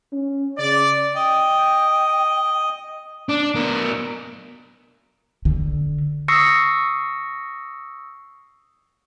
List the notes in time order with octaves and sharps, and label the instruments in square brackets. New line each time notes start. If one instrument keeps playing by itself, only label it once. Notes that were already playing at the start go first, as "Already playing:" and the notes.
[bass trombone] C#4
[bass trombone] C#3 [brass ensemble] D5
[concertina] D#5 [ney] G5
[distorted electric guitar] D4
B2 A#4
[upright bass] D3
[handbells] C#6 D#6 E6 A#6 C7 C#7